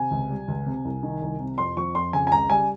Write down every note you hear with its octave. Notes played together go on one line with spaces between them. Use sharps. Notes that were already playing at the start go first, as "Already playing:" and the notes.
Already playing: C3 G#5
C#2
G3
C#2
C3
C2
D#3
C2
C3
F2 C6
F3 C#6
F2 C6
C#3 G#5
G#5
C#2 A#5
G3 G#5